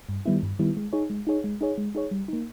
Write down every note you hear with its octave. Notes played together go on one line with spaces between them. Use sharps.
G2
D#3 G3 B3 E4
G2
D#3 G3 B3 E4
G#3
D#4 G#4 C#5
G#3
D#4 G#4 C#5
G#3
D#4 G#4 C#5
G#3
D#4 G#4 C#5
G3
A#3 D#4